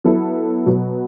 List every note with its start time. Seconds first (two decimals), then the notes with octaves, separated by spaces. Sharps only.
0.04 F#3 B3 E4 A4
0.66 B2 F#3 B3 F#4